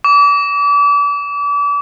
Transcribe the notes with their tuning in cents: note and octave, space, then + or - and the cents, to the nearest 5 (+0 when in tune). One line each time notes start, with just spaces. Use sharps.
D6 -35